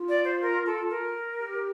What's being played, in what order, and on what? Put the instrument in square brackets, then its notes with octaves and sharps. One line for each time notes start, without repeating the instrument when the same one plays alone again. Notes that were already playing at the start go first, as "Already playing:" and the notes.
Already playing: [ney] F4
[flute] D5
C5
A#4
A4
A#4
[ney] G4